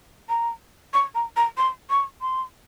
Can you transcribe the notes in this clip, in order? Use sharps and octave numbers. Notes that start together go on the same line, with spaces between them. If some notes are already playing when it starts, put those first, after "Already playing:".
A#5
C#6
A#5
A#5
C6
C#6
C6